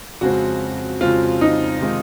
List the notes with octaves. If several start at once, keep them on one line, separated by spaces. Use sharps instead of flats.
F2 C#3 G#3 C4 F#4
F2 C#3 G#3 C4 F4
D#4
C3 D#3 G#3 C4 F4